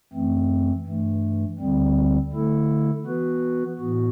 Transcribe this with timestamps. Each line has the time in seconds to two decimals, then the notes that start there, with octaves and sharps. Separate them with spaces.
0.13 F#2 E3 A3 C4
0.86 G2 E3 A3
1.59 D2 D3 G3 C4
2.32 D3 A3 E4 A4
3.05 E3 B3 F#4 B4
3.78 A2 E3 B3 F#4